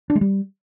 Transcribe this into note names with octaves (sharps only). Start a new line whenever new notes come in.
D4
G#3
G3